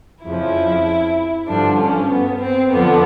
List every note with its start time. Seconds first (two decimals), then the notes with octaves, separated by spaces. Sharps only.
0.25 F2 C#3 F3 E4
1.48 G2 D3 F3 D4
1.80 C#4
2.11 B3
2.41 C4
2.72 F2 D3 F3 B3